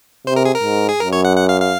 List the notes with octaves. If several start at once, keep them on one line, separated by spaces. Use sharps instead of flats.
C3 C5
A#4
G#4
A#4
G#2
G#4
F#2 A#4
C#5
F#5
F#5
F5
F5